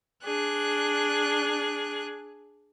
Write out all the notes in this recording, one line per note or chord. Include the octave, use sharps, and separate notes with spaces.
D4 G#4 F#6